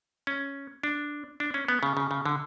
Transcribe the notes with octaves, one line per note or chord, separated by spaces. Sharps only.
C#4
D4
D4
C#4
B3
C#3
C#3
C#3
D3